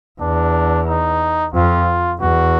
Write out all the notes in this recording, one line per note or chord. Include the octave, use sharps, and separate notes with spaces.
E2 D4
D#4
F2 F4
E2 F#4